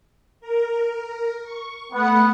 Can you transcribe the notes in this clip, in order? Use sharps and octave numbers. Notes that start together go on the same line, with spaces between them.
A#4
C#6
A3 B3 F#5 C#7